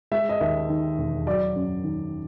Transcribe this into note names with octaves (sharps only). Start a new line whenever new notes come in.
G#3 E5
D#5
D#2 E5
D#3
E1
F#3 D5
F#2
D#3